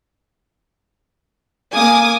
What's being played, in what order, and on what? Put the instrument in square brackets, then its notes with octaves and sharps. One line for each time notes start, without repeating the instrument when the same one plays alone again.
[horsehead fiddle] A#3 [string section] G#5 D6 D#6